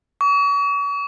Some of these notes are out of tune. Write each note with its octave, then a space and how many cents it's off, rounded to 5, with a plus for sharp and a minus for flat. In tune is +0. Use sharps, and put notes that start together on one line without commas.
C#6 +40